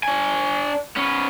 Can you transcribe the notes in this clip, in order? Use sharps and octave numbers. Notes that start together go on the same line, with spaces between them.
D4 G#5
B3 C#4